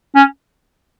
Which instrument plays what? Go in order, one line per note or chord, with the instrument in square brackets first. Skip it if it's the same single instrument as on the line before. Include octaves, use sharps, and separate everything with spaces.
[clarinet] C#4